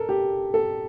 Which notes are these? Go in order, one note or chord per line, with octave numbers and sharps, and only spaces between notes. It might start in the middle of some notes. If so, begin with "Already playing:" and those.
Already playing: A4 A#4
G4
A4